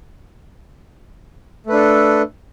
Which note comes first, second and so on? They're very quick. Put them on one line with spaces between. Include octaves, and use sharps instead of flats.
A3 B4 D4 A4